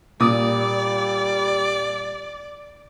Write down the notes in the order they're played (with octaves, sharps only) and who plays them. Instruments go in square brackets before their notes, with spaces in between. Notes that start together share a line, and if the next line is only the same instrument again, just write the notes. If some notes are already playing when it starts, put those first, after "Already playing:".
[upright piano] A#2 D6 D#6 [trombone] G3 [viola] D5